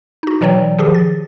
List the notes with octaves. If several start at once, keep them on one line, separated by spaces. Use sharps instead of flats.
D#4 F#4
B2 E3 F#3 C#5 D5 G5
D#3 F3 G4 G#4
A6